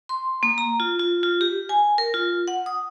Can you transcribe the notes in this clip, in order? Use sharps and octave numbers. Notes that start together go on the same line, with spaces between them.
C6
A#3
A#5
F4
F4
F4
G4
G#5
A#4
F4
F#5
D#6